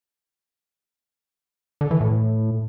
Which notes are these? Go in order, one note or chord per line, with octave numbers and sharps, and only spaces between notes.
D3
E3
A2